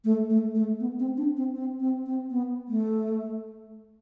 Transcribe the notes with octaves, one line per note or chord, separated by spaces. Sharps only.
A3
A3
A3
B3
C4
D4
C4
C4
C4
C4
B3
A3